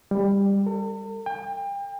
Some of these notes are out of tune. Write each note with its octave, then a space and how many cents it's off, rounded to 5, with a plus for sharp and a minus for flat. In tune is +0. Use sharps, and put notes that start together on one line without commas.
G3 +20
A4 +45
G5 +35